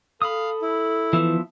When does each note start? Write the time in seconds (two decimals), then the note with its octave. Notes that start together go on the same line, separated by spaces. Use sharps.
0.22 A4 F5 B5 D#6
0.62 E4
1.13 E3 F3 B3 E5